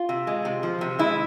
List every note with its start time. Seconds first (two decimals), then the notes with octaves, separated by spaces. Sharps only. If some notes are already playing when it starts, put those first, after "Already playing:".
Already playing: F4
0.09 C3
0.27 G#3
0.45 C3
0.63 F3
0.81 C3
0.99 G#3 E4